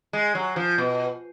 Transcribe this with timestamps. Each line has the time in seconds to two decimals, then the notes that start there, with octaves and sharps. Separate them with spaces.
0.13 G#3
0.35 F#3
0.56 F3
0.78 B2